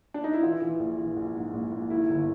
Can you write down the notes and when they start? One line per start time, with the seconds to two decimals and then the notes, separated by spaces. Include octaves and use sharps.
0.14 D4
0.24 D#4
0.33 E4
0.43 E3 F4
0.62 E3
0.80 A#1
0.98 E3
1.17 A#1
1.35 G#2
1.53 A#1
1.72 A#1
1.90 D#3 E4
2.09 G1